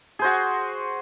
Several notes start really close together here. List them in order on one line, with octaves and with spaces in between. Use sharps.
G#4 C5 F#4